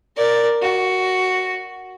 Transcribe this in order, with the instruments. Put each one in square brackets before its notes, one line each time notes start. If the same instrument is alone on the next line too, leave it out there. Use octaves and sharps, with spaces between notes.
[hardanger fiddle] A#4 D5
F#4